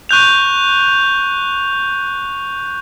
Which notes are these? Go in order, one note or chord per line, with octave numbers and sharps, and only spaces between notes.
C#6 F#6 G6 F7